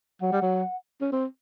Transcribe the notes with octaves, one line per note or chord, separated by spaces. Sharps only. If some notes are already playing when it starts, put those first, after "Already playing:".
F#3 F#5
G3
F#3
C#4
C4